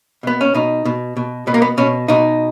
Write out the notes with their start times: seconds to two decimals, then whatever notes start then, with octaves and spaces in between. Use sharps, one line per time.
0.23 B2 B3
0.41 C#4
0.54 B2 D#4
0.85 B2
1.17 B2
1.47 B2 B3
1.54 A#3
1.62 B3
1.78 B2 C#4
2.08 B2 D#4